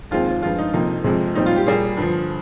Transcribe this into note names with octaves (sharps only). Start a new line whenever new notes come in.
D#2 D#3 G#3 C4 F4
F4
G2 F3 G#3 F4
D#4
F2 C3 F3 A#3 D#4
F2 C3 F3 G#3
A#2 G3 C4 D#4
F4
G4
A#2 G3 A#3 G#4
G2 D3 F3